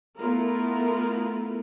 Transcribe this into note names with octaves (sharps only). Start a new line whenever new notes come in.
A3 B3 E4 F4 A#4